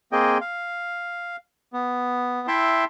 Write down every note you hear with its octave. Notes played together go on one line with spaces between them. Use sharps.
A#3 C4 G#4 D#5 G5
F5
B3
E4 E5 G5 A5 C6